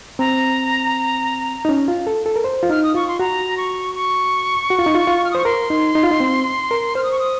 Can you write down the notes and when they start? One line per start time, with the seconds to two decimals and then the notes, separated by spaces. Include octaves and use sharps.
0.19 C4 A#5
1.65 D#4
1.69 C#4
1.88 F4
2.07 A4
2.26 A4
2.36 A#4
2.44 C5
2.63 F4
2.70 D#4 F6
2.83 D#6
2.94 F4 C#6
3.08 C6
3.19 F#4 A#5
3.57 C#6
3.95 C#6
4.70 F#4
4.79 F4
4.86 D#4
4.95 F4
5.07 F4
5.24 F6
5.31 D#6
5.35 C5 C#6
5.45 A#4 C6
5.70 D#4
5.95 D#4
6.03 F4
6.11 D#4
6.20 C4
6.71 A#4
6.95 C5 F6
7.03 D#6
7.12 C#6
7.19 D#6